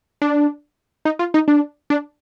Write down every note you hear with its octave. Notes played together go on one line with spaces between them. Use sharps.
D4
D#4
F4
D#4
D4
D4